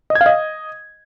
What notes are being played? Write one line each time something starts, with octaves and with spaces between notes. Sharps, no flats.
D#5
G#6
F5
D#5